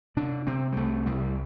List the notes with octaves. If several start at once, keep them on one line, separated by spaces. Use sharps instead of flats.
C3 D4
C3 C4
G3
C2 A3
C2 G3